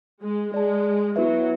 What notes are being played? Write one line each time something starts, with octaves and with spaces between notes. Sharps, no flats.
G#3
G#3 G#4 D5 A5
F#3 B3 E4 B4 E5